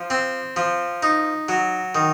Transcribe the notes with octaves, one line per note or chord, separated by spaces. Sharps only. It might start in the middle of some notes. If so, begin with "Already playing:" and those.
Already playing: F3
C4
F3
D#4
F#3
D#3